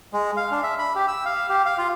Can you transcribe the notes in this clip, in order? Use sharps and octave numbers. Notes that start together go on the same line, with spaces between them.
G#3
F5
D4
E5
B5
G4
E6
F5
G4
F5
F4